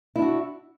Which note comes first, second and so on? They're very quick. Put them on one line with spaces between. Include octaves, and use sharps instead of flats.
E4 D4 F#4